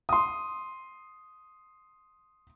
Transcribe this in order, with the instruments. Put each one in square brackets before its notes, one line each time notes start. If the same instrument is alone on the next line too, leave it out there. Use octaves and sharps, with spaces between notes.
[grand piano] C6 D#6